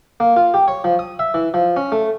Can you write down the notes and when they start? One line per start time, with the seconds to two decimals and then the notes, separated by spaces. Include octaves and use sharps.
0.20 A#3
0.36 F4
0.54 G4
0.68 C#5
0.84 F3
0.99 D#6
1.19 E5
1.34 E3
1.54 F3
1.76 C#4
1.92 A3